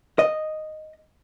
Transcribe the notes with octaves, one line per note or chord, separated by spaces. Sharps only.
D#5